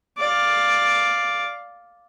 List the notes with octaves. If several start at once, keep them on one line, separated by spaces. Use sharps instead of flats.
D5 F5